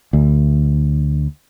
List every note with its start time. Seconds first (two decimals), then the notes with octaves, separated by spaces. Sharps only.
0.13 D2